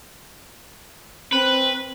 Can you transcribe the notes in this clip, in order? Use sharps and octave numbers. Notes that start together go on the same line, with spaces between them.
C4 B4